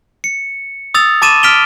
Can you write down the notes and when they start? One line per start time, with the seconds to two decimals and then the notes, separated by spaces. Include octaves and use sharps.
0.24 C#7
0.94 D#6 E6 A6 F7
1.22 A5 C6 D6 A6 D#7 E7
1.43 F6 B6 D7 F7 G7